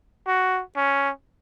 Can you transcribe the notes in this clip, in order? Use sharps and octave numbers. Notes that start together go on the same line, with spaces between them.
F#4
C#4